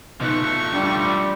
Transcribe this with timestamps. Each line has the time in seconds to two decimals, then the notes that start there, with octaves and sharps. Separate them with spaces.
0.20 B2 F3 A3 D#4 C#6 F#6
0.73 G3 D4